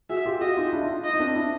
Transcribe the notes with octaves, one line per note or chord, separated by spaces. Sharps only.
F#4 G#4 E5
F4 G4
F#4 G#4 D#5
D#4 F4
D4 E4
D#4 F4
D#5
D#4
C4 D4
D4 E4